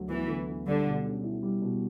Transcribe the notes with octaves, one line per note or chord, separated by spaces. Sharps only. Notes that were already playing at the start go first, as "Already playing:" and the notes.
Already playing: D2 D3 F#3
E3 B3
D3
D2
D3 G3
B2
C#4
E4
G3
B2